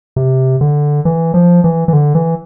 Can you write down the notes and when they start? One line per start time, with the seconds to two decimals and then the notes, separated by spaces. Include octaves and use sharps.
0.16 C3
0.61 D3
1.05 E3
1.34 F3
1.64 E3
1.88 E3
1.93 D3
2.15 E3